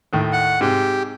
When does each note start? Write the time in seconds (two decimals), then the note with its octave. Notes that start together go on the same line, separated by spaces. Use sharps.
0.13 D#2 A2 D#3
0.33 F#5
0.61 G#2 C3 G4